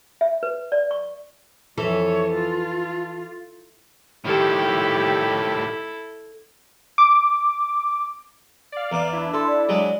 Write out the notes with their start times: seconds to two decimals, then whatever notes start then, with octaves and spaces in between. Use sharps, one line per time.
0.21 E5
0.43 B4
0.72 D5
0.91 C#6
1.78 F2 E3 A4 C#5
2.34 F4
4.25 A2 D#3 E4 G4 A4
6.98 D6
8.72 D5 F5
8.92 E2 A#5 D6
9.13 D4 E4
9.34 A4 C6
9.47 D5
9.69 F#3 G#3